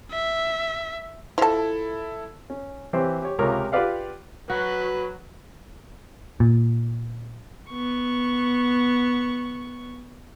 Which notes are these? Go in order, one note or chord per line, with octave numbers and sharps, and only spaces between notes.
E5
F3 E4 A4 A5
C#4
E3 C4 G4 C5 C#5
G4 C#5
C#2 C3 F4 G4 A#4 C#5
F4 G4 B4 D5 F5 F#5
F#3 F#4 B4
A#2
B3 C#6